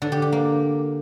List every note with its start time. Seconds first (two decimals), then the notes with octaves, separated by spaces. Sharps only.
0.02 D3
0.12 G4
0.22 G4
0.32 A#3